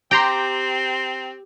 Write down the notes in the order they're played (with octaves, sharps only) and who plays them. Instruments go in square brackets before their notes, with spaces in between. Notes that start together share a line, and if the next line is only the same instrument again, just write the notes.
[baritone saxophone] C4 [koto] G4 [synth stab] G5 A#5 C6